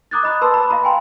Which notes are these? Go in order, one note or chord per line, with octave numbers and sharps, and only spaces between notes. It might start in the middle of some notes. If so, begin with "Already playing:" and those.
A#5 D6 D#6 F#6 G#6 A6
D#5 B5 D#6 F#6
B4 A5 C6 E6
B5
F5 A#5 B5
G5 G#5 C6